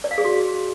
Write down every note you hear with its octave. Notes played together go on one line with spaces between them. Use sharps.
D5
F5
G#4
F#4